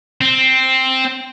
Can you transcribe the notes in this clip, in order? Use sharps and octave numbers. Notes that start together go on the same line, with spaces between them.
C4